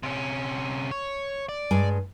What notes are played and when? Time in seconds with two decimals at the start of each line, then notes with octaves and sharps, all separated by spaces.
0.03 C3 C#4
0.91 C#5
1.49 D5
1.71 G2 G#3 G#5